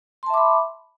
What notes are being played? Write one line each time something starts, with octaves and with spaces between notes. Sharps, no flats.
E5 A5 B5 C6 D6